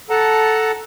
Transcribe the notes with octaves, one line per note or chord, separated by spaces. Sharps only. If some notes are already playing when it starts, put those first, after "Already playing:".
A4 F#5 A5 A#5